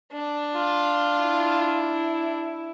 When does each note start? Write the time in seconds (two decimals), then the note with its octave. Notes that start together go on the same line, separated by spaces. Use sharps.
0.13 D4
0.55 F4
1.22 E4